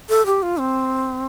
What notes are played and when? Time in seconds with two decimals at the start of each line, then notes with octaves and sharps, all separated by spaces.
0.09 A4
0.26 G4
0.42 F4
0.59 C4